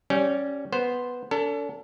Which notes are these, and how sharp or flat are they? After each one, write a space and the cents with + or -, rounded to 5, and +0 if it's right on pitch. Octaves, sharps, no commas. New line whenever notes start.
G3 -20 C#4 +0
B3 +0 C5 +0
D4 -45 A4 +30